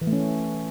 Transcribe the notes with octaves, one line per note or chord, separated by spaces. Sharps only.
E3
A3
C#4